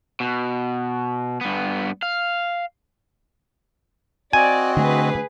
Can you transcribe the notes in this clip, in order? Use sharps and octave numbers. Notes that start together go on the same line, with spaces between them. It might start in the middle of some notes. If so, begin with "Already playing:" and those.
B2
G2 B3
F5
C4 F#4 D5 D#5 G#5
D3 A3 G#4 B4